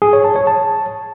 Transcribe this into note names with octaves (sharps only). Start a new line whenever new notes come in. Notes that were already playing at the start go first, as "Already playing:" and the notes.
G#4
C#5
A5
C#5
A5